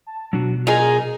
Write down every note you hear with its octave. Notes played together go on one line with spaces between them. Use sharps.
A5
B2 F#3 D4 F#4
D#4 F4 G#4 A#4 A#5